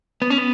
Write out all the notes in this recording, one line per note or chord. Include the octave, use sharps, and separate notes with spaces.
B3
C#4
B3